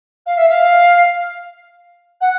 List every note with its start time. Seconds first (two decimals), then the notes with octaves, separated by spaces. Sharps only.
0.26 F5
0.37 E5
0.49 F5
2.21 F#5